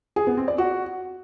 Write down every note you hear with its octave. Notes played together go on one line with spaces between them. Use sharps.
G#4
B3
C4
D5
F#4